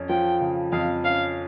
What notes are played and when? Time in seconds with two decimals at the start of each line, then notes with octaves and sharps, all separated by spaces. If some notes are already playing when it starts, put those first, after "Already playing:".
Already playing: F2 C#4
0.09 F3 G5
0.41 C#3
0.72 F2 F5
1.04 C#4 F5